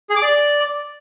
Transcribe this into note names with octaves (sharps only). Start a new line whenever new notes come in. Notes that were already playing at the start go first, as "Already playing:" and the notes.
G#4
D6
D5